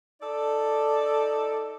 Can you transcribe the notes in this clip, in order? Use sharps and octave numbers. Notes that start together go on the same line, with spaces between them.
D#4 A4 D5